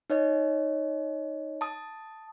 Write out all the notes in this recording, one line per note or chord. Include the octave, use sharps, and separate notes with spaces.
D#4 C#5 D#5
A5 D#6